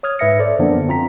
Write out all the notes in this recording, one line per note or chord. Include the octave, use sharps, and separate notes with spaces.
C#5 D#6 F6 G#6
G#2 B4 E5 A#6 C#7
A4 C5 D5
F#2 D3 F3 A#3 B3 D4
C4 F4 A#5 B6